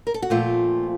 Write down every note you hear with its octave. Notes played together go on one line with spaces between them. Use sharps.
A#4
A4
F#4
A#2 F3 A3 C4 F4